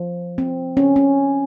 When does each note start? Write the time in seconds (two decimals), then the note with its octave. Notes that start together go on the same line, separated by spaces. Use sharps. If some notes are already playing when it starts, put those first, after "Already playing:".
Already playing: F3
0.38 C4
0.77 C#4
0.96 C#4